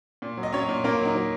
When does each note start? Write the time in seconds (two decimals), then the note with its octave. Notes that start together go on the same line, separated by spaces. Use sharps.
0.22 A#2
0.37 F#3
0.43 D#5
0.53 F#3 C#4 C#5
0.69 A#2
0.84 A#2 A#3 A#4
1.00 F#3
1.05 D#4
1.15 F#3